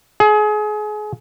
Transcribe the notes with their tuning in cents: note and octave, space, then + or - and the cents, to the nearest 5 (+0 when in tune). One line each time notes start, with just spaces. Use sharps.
G#4 +30